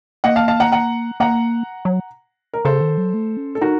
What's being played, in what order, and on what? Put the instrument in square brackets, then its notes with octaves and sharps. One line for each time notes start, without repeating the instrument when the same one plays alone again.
[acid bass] A#3 [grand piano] D#5 F#5
[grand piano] F5 A5
F5 A5
F#5 A#5
F#5 A#5
[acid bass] A#3 [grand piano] F#5 A#5
[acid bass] F#3
[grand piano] A#4
[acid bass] C#3 [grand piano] A4 C5
[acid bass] D#3
F#3
A3
C#4
[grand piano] A4
[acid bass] D#4 [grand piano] F#4 A#4